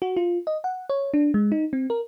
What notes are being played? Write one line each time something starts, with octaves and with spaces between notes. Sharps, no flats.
F#4
F4
D#5
F#5
C#5
D4
G#3
D#4
C4
A#4